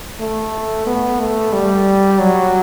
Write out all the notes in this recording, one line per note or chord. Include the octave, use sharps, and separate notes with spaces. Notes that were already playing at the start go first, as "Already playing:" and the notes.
A3
B3
A3
G3
F#3